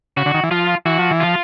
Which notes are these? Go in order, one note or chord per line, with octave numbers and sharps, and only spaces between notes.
C#3 F#4
D3
D#3
E3
F3 F4
E3 F#4
F3
E3
F3 F4